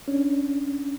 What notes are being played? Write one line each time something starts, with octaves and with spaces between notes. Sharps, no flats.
C#4 D4